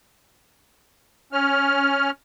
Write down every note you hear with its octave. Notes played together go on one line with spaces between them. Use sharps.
C#4 F6